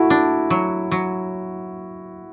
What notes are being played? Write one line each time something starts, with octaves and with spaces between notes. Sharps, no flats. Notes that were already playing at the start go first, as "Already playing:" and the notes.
Already playing: A3 E4 F#4
D4
F#3
F#3